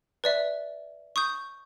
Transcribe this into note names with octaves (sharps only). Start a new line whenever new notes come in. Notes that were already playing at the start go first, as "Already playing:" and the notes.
B4 D5 E5
C#6 D#6 G6